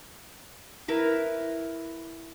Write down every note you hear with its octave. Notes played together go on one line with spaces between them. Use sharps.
E4 A#4 B4